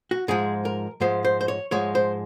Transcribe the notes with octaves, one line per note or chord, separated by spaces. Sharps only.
F#4
G#2 F3 G#3 G#4
A#4
G#2 F3 G#3 C5
C5
C5
C#5
G#2 F3 G#3 C#5
C5